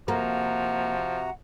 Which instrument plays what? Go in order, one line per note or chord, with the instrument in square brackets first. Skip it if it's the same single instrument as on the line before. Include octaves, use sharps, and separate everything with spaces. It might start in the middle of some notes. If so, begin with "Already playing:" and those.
[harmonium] C3 F#4 A#5 [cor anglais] F3 [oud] A#3 [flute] F#5